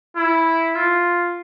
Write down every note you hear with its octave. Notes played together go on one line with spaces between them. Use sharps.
E4
F4